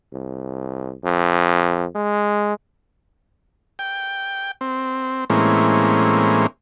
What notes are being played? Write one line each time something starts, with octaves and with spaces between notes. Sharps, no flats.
C2
F2
G#3
G5
C4
A2 E3 G#3 A#3 C4 C#4